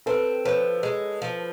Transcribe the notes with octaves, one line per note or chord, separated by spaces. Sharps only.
C4 A4 B4
F3 B4 C#5
G#3
F3